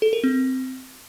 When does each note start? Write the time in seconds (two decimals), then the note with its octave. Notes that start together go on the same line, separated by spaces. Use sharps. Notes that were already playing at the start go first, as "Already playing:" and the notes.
0.02 A4
0.13 A#4
0.24 C4